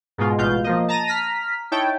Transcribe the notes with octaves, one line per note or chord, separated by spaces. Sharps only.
G#2 B2 G#3 F4
A1 B2 G#3 F4 F5 G6
F3 A#3 D#5
A5 A#5 A#6 D#7
A#5 F6 B6
D#4 E4 C#5 G5 A5